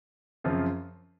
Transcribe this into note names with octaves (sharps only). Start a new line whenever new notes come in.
F#2 C#3 F3 C4 F4